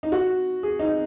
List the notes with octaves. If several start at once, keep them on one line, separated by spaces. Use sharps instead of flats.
D#4
F#4
G#4
D#4